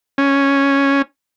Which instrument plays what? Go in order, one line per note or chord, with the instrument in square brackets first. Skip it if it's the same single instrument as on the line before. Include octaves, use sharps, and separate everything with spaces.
[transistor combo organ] C#4